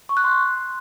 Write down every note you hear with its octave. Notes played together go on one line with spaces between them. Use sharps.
C#6
F#6
C6